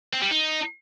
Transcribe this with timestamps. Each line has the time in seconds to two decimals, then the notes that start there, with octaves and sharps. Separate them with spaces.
0.13 C4
0.22 G3
0.31 D#4